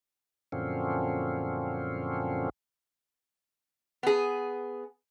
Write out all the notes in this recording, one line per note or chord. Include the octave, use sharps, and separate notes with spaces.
F#2 A#2 D3 F3 C4 C#4
B3 G#4